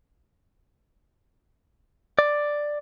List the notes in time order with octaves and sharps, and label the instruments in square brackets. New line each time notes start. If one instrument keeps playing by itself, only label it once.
[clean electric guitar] D5